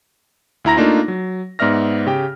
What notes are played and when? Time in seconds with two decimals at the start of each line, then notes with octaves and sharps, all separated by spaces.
0.65 D2 E4 A#5 A#6
0.76 A3 A#3 D4 D#4 F4
1.08 F#3
1.59 G#2 B3 D5 E5 F6 A#6
2.06 C#3 G4 G5